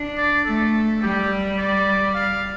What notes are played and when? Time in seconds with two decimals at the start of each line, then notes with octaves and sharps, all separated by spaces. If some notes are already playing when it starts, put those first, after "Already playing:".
Already playing: D4
0.18 D5
0.45 A3 A4
1.02 G3 G4
1.58 D5
2.14 F5